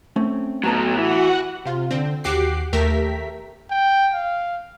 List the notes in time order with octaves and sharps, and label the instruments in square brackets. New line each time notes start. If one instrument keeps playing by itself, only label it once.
[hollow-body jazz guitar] A3 C4 C#4
[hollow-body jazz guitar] A2 A5 A#5 [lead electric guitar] F#3 B3
[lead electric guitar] E3 [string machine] F#4 F#5
[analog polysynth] C3 F4
D3 C4
D#2 F#4 G4 D6 F#6 C7
D#2 A3 G4 A#4 E5 B6
[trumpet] G5
F5